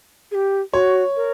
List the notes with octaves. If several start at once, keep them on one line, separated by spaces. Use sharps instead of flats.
G#4
G4
F#4 C#5
A#4